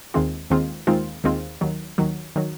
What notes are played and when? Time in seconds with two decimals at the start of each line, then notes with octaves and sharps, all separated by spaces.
0.14 D#2 D#3 G#3 C4 F4
0.50 D#2 D#3 G#3 C4 F4
0.87 D#2 D#3 G#3 C4 F4
1.24 D#2 D#3 G#3 C4 F4
1.61 D#2 D#3 F#3
1.98 D#2 D#3 F#3
2.36 D#3 F#3